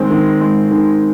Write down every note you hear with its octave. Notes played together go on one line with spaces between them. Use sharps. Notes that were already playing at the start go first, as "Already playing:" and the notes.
Already playing: D#3 G#3 C4
D#3
G#3
D#3